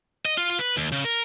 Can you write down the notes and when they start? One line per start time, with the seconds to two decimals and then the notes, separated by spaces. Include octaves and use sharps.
0.25 D#5
0.37 F4
0.59 B4
0.77 D#2
0.92 C#3
1.05 A#4